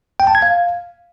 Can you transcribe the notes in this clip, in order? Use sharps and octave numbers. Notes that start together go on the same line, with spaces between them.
G5
A5
G#6
F5